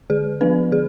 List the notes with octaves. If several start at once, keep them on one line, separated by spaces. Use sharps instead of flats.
D3 G#4
F3 B3 D4 B4
D3 G#4